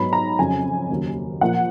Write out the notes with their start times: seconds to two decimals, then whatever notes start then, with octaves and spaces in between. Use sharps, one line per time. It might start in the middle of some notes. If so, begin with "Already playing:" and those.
Already playing: G#2 F#3 B3 B5
0.13 A#5
0.39 F2 C#3 F#3 G#5
0.90 D#2 C#3 F#3 A#3
1.41 A#2 F3 A#3 F#5